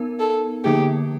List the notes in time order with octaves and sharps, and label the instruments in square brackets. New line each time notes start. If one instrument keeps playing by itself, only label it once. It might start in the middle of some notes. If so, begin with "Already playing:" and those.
Already playing: [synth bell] B3 D#4 A#4
[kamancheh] A4
[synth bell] D3 F3 A#3 D#4 G#4 [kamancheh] G4